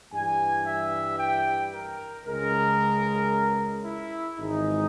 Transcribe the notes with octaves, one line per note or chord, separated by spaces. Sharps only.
G2 E3 G3 G#5
E5
G5
A#4
C#2 C#3 G#3 A#4
E4
G#1 G#2 E3 G#3 D#4